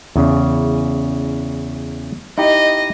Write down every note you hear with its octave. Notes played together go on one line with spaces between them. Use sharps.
E2 C#3
D#4 E4 G4 D#5